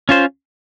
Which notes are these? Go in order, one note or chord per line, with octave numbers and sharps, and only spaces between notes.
C#4 F4 C5